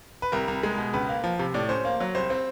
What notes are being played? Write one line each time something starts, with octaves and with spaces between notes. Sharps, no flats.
B4
C2 A#4
C2
G#3
B2
C#2 B4
A#3
F3
C3
A2 D5
C#4 C5
A#3
F#3
C2 C5
C4